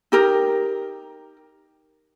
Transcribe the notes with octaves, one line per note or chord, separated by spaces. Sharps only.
D#4 G4 A#4